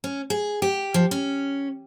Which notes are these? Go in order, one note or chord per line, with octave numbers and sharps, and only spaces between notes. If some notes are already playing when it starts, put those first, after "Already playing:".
C#4
G#4
G4
F3
C#4